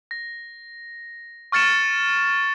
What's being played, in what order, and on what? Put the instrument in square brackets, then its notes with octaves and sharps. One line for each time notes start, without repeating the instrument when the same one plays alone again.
[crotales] A#6
C#6 F6 A6 C#7 E7